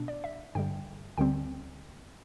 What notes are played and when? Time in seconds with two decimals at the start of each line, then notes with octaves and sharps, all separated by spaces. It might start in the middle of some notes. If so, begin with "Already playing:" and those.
Already playing: B2 B3 D4
0.08 D5
0.24 E5
0.55 G2 D3 G3 G5
1.18 D2 D3 G3 C4 G5